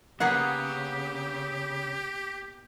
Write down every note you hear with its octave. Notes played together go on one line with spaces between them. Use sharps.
C#3 A#3 B3 G4 G#4 F#5